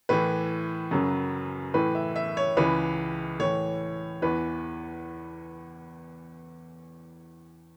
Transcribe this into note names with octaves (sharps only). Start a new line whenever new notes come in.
A2 E3 B4
F#2 C#3 F#3
A2 E3 B4
E5
E5
C#5
C#2 C#3 E3 B4
A2 E3 C#5
E2 E3 B4